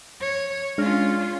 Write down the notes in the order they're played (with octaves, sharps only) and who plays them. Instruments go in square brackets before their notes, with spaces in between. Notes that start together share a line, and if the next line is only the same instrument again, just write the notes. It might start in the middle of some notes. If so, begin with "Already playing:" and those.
[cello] C#5
[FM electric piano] G#3 D4 F6 [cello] C#4 F4